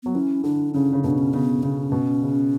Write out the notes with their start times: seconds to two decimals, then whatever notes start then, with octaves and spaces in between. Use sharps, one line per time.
0.03 F#3 B3
0.15 E3 C#4
0.44 D3 D4
0.74 C#3 C#4
0.93 C#3
1.03 B2 C#4
1.10 D4
1.18 C#4
1.33 C#3 B3
1.63 C#3 C#4
1.92 B2
2.22 C#3